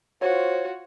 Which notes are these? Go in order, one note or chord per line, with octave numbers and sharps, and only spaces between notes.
F4 F#4 C5 C#5